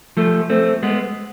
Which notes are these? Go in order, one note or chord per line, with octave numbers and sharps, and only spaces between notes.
F3 A3
A3 C4
G#3 B3